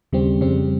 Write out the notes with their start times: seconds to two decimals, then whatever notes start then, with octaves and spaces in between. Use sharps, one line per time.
0.12 D#2 C#3 G3 C4
0.41 F2 C#3 G3 C4